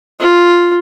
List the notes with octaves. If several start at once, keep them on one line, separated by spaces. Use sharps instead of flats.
F4